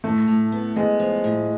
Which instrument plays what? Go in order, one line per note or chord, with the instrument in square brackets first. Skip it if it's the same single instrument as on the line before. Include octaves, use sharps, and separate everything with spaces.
[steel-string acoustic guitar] A2 [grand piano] A3
[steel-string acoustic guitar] A2
B3
[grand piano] G#3 [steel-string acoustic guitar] B3
[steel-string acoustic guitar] F3
A2